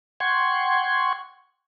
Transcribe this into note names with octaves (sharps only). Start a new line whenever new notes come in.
F#5 G5 C6 C#6 G#6